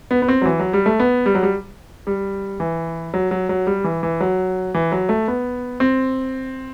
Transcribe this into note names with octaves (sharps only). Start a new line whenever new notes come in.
B3
B3
C4
F#3
E3
F#3
G3
A3
B3
G3
F#3
G3
G3
E3
F#3
F#3
F#3
G3
E3
E3
F#3
E3
F#3
A3
B3
C4